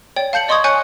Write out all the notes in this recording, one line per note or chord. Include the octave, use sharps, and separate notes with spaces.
C#5 D5 G5
F5 A5 G6 C#7 F#7
D5 D#5 C6 C#6 D#6 G#6
C#5 G#5 C#6 F#6 G6 C#7